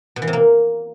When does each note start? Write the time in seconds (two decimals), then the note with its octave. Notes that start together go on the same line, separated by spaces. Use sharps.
0.16 B2
0.22 E3
0.27 C3
0.33 A#3